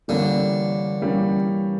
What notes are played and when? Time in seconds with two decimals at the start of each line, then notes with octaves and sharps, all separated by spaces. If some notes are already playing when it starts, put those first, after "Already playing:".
0.08 D3 E3 G3 A#3 C#4
1.02 E3 G3 A#3 C#4